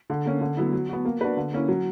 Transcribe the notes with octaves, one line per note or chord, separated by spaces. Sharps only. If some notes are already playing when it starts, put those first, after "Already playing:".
D3
A#3 C#4
D3
F#3 B3 E4
F#3
B3 F#4
A#3
D4 F#4 B4
D3
A#3 C#4 E4
F#3